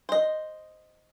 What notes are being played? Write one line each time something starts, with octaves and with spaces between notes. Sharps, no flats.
C5 D#5